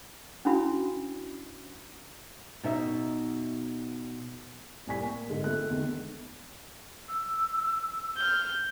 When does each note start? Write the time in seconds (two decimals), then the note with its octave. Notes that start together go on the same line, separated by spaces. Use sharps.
0.45 C#4 D4 E4 F#4 B5
2.63 B2 D#4 E5
4.87 C2 A2 D5 G#5 C#6 B6
5.00 A#3 G#5
5.29 G#2 D3 G#3
5.44 A3 F4 F#6
5.70 E2 D3 D#3 G#3
7.08 E6
8.17 F6 G6